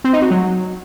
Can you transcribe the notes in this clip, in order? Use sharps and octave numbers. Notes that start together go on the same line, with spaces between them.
C4
D#4
F#4
F#3